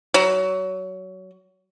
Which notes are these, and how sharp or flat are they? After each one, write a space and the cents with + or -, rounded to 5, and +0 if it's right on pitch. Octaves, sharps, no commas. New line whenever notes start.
F#3 +20